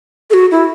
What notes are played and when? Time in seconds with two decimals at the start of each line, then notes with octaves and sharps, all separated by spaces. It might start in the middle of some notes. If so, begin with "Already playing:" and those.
0.30 A4
0.34 F#4
0.51 E4